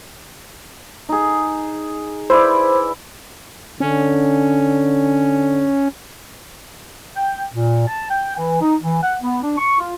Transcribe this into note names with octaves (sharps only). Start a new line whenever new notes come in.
D#4 G#4
E4 B4 C5 D5
D3 C#4
G5
A#2
A5
G5
E3
D#4
E3
F#5
B3
D4
C#6
F4